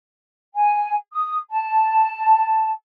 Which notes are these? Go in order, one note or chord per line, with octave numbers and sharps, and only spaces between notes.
G#5
D#6
A5